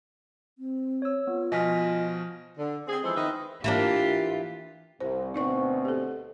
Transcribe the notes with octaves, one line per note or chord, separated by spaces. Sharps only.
C4
C#5 E6
B3 F4
B2 F3 D#5 G#5 F6 B6
D3
C4 G#4
E3 F3 G#3 A4 C5
D#3 B3 B4 D#5 E5
E3 A#3 D4 F4 G4
C2 C5
D2 B2 C4 D#4 D5 C#6
G4 A4